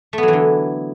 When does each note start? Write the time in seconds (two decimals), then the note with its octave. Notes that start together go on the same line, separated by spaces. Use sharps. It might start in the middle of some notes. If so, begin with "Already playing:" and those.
0.13 A3
0.18 B3
0.23 F#3
0.28 E3
0.33 D3